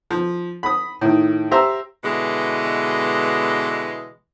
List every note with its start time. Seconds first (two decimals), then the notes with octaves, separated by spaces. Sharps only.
0.11 F3
0.63 B5 D#6
1.01 A2 D#3
1.51 G4 C5 E5 A#5 E6
2.04 B2 D3 E3 G#3